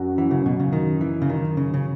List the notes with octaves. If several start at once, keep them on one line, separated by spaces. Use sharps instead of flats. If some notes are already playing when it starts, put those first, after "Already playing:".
Already playing: F#2 F#4
E3
C#3
B2
C#3
D#3
E3
C#3
D#3
C#3
C#3